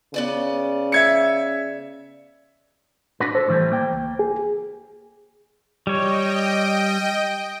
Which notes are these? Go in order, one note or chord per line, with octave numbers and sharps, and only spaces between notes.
C#3 B3 D5 D#5
E5 G#6 C#7
D4 F#4 B4
A4 C5
A2 E3 G3
A#3 G5
C#2
G#4
G3 C#5 D#5 G5